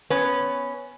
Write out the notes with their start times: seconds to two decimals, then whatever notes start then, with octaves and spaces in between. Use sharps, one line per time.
0.10 B3 C#4 B4